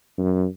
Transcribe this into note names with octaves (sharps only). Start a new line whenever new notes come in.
F#2